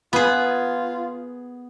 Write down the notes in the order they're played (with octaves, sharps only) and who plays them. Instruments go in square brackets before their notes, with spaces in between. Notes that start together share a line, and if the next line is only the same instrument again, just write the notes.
[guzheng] B3 G#4 [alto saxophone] F4